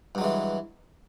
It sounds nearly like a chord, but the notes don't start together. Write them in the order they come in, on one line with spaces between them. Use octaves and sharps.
G2 F#3 G#3 E3